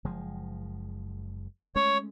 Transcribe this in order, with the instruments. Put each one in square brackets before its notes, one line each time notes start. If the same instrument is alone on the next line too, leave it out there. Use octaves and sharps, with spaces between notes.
[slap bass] F#1 F3 G#3
[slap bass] G#3 A3 C#4 [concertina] C#5